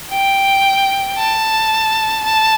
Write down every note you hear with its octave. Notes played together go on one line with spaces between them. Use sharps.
G5
A5
A5